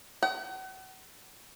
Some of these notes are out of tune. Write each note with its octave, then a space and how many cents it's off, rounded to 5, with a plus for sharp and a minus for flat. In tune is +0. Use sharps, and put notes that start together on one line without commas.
F#5 +40